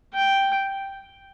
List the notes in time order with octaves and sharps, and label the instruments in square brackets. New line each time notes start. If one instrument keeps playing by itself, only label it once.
[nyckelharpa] G5